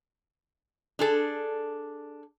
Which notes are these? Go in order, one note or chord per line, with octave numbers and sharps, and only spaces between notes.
D4 G#4 A4